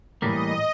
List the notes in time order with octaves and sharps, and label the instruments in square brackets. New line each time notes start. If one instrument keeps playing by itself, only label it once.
[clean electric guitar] A2 E3 G3 A#3 [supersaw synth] D#5